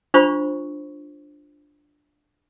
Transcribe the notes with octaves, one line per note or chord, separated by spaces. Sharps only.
D4 F4 C5 B5 C#6